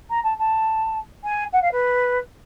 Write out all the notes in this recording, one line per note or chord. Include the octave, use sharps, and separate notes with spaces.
A#5
A5
A5
G#5
F#5
F5
B4